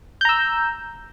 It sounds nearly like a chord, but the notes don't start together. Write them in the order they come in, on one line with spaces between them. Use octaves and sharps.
G6 A#5 E6